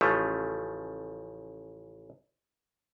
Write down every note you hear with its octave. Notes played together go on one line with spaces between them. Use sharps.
A1 C#3 F3 A3